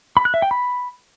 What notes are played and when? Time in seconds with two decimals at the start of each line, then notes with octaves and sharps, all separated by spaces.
0.17 B5
0.25 F#6
0.34 E5
0.42 G5
0.51 B5